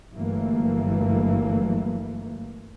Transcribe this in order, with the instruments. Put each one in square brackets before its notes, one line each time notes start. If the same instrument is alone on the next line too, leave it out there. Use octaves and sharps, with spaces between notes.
[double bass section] G1 G2 E3 F#3 A3 A#3